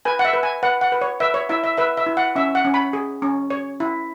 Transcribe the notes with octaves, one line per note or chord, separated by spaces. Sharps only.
B4 G#5
F#5
E5
B4
G#5
B4 F#5
F#5
B4
C#5
B4 E5
C#5
E4 E5
E5
B4 E5
E5
E4
F#5
C#4 E5
F#5
C#4
B5
G#4
C#4
C#5
E4